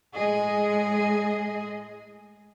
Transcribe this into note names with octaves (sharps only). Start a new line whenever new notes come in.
A2 G#3 G#4 D#5